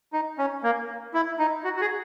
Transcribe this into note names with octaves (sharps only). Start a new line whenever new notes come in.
D#4
C#4
A#3
E4
D#4
F#4
F#4
G#4